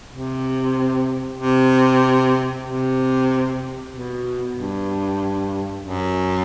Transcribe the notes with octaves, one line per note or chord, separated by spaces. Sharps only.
C3
C3
C3
B2
G2
F#2